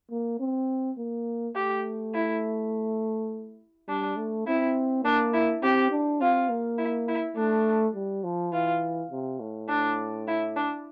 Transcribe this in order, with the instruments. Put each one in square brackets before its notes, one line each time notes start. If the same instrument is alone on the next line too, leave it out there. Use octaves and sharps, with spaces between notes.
[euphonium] A#3
C4
A#3
[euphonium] A3 [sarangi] G4
[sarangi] E4
[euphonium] G3 [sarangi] D4
[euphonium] A3
[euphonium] C4 [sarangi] E4
[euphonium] A#3 [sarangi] D4
[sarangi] E4
[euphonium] C4 [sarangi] G4
[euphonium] D4
[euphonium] C4 [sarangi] F4
[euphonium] A#3
[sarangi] E4
E4
[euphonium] A3 [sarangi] D4
[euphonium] G3
F3
[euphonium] E3 [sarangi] F4
[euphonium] C3
A2
[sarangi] D4
E4
D4